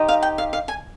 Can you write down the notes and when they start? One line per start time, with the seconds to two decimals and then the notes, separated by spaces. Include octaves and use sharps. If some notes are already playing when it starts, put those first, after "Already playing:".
Already playing: D#4 G4 C5 D#5
0.09 F5
0.23 G5
0.38 F5
0.53 F5
0.68 G#5